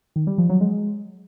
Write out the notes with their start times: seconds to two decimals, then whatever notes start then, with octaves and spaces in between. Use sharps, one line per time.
0.16 D#3
0.27 G3
0.38 F3
0.49 F#3
0.61 G#3